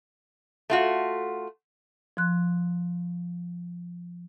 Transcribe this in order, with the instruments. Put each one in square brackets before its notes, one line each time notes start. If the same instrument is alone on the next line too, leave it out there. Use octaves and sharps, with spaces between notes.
[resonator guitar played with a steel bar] A3 F4 F#4
[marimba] F3 C6 F#6